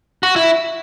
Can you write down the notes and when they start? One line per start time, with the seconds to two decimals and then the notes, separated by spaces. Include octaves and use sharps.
0.23 F#4
0.36 E4